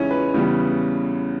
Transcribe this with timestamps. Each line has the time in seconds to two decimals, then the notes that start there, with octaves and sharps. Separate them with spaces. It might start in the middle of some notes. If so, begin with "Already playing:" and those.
Already playing: E2 C#3 G#3 C#4 D#4 E4 C#5
0.11 B4
0.34 E2 C#3 E3 G3 B3